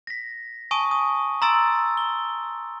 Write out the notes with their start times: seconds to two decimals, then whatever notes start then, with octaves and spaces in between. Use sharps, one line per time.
0.07 A#6 B6
0.71 G#5 A5 C#6 D#6 D#7
0.91 D#6
1.42 A#5 C6 E6 A6 D7
1.97 G7